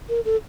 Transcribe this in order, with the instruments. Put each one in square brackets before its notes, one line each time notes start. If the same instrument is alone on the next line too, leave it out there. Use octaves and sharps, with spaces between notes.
[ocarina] A#4
A4